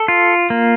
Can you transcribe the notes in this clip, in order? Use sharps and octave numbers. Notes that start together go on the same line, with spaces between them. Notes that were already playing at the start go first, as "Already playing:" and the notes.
Already playing: A4
F4
A#3